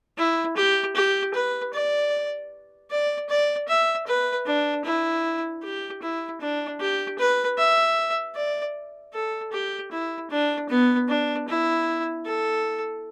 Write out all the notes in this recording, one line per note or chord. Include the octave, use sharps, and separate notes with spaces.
E4
G4
G4
B4
D5
D5
D5
E5
B4
D4
E4
G4
E4
D4
G4
B4
E5
D5
A4
G4
E4
D4
B3
D4
E4
A4